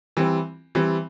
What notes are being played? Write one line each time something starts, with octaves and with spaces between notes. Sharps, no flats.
E3 G3 C4
E3 G3 C4